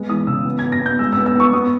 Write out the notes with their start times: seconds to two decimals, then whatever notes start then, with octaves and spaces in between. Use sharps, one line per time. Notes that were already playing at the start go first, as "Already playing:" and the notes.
Already playing: G#3 B3
0.09 E3 D#6
0.27 C#3 E6
0.45 B3
0.59 G#6
0.63 B3
0.72 A#6
0.81 B3 G6
0.99 G#3 E6
1.13 E6
1.17 B3
1.26 E6
1.35 B3 C#6
1.53 B3 D#6